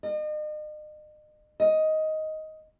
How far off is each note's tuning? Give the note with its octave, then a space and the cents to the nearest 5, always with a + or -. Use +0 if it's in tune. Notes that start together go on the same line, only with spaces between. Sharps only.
D#5 -40
D#5 +10